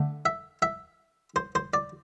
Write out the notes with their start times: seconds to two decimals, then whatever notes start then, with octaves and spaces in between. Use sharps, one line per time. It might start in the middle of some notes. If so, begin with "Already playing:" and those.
Already playing: D3 A3
0.26 E5
0.62 E5
1.36 C5
1.55 C5
1.74 D5